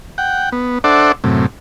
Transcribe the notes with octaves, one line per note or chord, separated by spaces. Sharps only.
F#5 G5
B3
D4 A4 C5 D5 E5 F#5
F#2 A2 C3